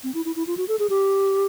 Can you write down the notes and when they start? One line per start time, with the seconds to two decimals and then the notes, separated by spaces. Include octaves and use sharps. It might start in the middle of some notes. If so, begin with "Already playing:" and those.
0.04 C4
0.14 E4
0.25 E4
0.36 E4
0.47 F4
0.57 F#4
0.68 A4
0.79 G#4
0.90 G4